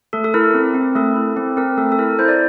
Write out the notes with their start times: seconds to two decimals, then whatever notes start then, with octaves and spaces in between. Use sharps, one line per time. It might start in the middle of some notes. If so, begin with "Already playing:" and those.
0.13 A3 A4
0.24 A4
0.34 E4 A#4
0.54 C4
0.74 C4
0.95 A3 A4
1.15 E4
1.37 C4
1.57 C4 A#4
1.78 A3 A4
1.92 A4
1.99 E4 A#4
2.19 E4 C5
2.28 D5